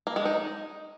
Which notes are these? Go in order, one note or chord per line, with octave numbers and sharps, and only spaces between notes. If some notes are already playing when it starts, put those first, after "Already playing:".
A#3
G#3
D#4